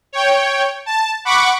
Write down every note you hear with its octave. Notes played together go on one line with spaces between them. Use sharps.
C#5 G5
A5
F#5 B5 C#6 D6